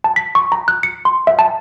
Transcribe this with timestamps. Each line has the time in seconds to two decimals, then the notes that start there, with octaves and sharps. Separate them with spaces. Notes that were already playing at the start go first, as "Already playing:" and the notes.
0.04 A5
0.16 B6
0.35 C#6
0.52 A#5
0.68 F#6
0.83 C#7
1.05 C6
1.27 E5
1.39 A5